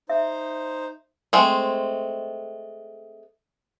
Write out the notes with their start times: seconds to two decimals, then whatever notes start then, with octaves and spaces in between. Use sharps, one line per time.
0.09 D#4 C5 E5
1.33 G#3 A3 C4